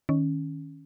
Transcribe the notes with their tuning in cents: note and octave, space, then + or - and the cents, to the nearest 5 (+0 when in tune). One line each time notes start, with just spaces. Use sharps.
D#3 +0 C#4 +0